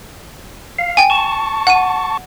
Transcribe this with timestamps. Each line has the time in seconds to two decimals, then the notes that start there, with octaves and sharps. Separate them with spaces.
0.79 F5
0.97 G5 G#5
1.10 A5 C#6
1.67 F#5 D#7